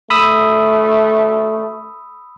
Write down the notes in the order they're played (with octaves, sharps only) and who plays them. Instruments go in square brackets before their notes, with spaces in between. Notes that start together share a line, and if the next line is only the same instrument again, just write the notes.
[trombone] A3 [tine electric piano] B5 D#6 E6